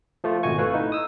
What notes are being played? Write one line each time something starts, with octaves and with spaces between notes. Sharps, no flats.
F3 A3 F4
G#1 B2 F#4 G#5 C#6
A3 E4 B4 F5
D#4
D#6 E6